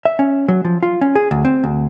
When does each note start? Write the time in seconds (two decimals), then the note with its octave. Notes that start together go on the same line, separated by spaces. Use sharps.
0.05 E5
0.19 C#4
0.48 F#3
0.65 F3
0.83 F4
1.01 C#4
1.15 G#4
1.31 D2
1.45 C4
1.64 D2